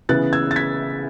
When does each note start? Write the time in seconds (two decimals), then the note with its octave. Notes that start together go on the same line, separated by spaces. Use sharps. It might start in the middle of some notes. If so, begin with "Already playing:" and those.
0.09 C#3 E3 B3 F#6 A6
0.33 E6 G#6
0.51 A6
0.56 G#6 B6